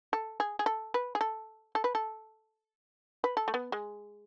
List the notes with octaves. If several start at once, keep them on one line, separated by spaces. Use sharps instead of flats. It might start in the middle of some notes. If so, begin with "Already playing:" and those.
A4
G#4
G#4
A4
B4
G#4
A4
A4
B4
A4
B4
A4
A3
B3
G#3